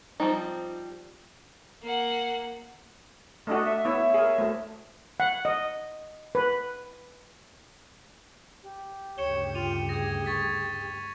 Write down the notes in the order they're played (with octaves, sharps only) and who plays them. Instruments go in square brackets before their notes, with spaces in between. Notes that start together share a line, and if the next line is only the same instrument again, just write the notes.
[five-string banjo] F3 G3 C4 D#4
[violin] A#3 F#5
[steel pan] A3 D4 F#4 [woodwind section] D#5
[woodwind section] E5
[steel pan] B3 E4 [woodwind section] C#5 E5
[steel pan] G#4 A#4
[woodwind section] D2 [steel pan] A3
[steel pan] F#5
D#5
B4
[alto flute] G4
[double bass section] D2 G2 C#3 [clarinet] C#5 [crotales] C#7 E7 G7
[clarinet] F4 [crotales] D#7 F7
[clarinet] G#4 [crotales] G#6 A#6
[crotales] C#6 A6 B6